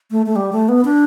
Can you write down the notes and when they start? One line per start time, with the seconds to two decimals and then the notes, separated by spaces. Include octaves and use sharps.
0.11 A3
0.26 A3
0.36 G3
0.53 A3
0.69 B3
0.85 D4